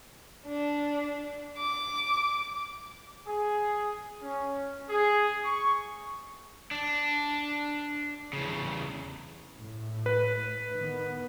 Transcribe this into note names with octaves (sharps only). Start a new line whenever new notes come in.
D4
D6
G#4
C#4
G#4
C#6
D4
E2 C#3
A2
B4
D#3 B3